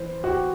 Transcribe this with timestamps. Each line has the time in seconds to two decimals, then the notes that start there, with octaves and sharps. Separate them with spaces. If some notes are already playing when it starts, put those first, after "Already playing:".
Already playing: E3 C5
0.24 F#4
0.29 G4